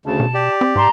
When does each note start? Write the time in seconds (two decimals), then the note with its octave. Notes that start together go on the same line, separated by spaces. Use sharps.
0.06 D2 C#3 A5
0.20 B2
0.34 G4 D5
0.61 C4
0.76 G#2 A5 A#5 C6